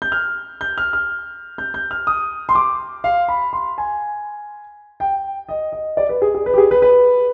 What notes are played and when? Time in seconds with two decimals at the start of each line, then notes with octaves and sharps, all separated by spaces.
0.02 G6
0.12 F6
0.61 G6
0.78 F6
0.93 F6
1.58 G6
1.74 G6
1.91 F6
2.07 D#6
2.49 C6
2.55 D6
3.04 F5
3.28 B5
3.53 C6
3.78 G#5
5.00 G5
5.49 D#5
5.72 D#5
5.97 D5
6.09 B4
6.22 G#4
6.35 G#4
6.46 B4
6.53 G4
6.58 G#4
6.71 B4
6.82 B4